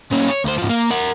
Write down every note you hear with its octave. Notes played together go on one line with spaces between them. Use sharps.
A#2 C#4
C#5
D2 C5
G#2 F3
A#3
A#4 F#5